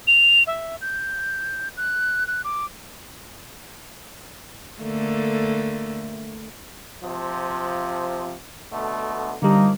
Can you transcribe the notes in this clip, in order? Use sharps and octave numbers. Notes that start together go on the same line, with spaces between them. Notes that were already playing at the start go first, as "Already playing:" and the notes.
F7
E5
G6
F#6
F#6
D6
D3 A3 A#3
C3 F3
B2 D3 A3
D3 F3 G3 A#3 D#4